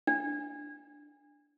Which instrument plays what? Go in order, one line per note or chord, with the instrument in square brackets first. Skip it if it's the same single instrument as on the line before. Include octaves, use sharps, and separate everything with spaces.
[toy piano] D4